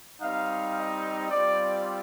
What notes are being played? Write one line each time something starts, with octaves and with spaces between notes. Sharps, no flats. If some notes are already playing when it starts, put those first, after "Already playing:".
G3 C4 D#4 F5
D#5
G3 C4 F4 D5